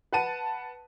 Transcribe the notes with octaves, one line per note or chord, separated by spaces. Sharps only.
B4 F#5 A5 D#7